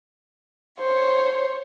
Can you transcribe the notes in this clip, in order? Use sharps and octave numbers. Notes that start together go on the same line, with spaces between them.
C5 C#5